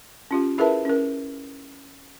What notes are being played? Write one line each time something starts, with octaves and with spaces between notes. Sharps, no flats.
C#4 F4 G4
E4 G#4 A#4 B4 E5 A5
C#4 A#4